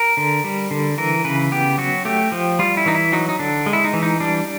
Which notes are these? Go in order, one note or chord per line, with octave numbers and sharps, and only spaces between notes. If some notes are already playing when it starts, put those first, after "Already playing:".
Already playing: A#4
D3
G3
D3
E3 A#4
C#3 B4
B3 G4
F#3 F#4
A3 G4
F3
G3 F4
E4
E3 D#4
E4
F#3 D#4
D#4
D3 D4
G#3
E4
D#4
E3
D#4
G3 D4